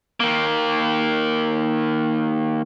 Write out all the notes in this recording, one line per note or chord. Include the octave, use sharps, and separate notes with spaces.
D#3 A#3